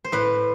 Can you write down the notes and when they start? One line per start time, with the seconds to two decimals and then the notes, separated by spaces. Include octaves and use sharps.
0.04 C5
0.12 A2 B4